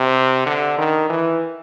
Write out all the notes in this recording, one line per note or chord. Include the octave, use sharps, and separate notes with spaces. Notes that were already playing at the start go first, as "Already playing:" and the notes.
Already playing: C3
D3
D#3
E3